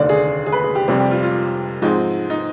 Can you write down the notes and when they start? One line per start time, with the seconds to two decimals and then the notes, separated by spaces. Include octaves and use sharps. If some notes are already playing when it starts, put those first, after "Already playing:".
Already playing: F1 D#2 D3 D5
0.09 G#4
0.46 G#4
0.52 B4
0.64 G#4
0.75 G4
0.88 F1 F2 C3 G3 G4
1.00 G4
1.11 F4
1.23 F4
1.82 G#2 F3 G#3 C4 D#4
2.30 D#4